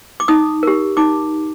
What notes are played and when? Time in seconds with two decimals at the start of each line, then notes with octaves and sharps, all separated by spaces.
0.20 D6
0.28 D#4 D#6
0.63 G4 A#4
0.97 D#4 D6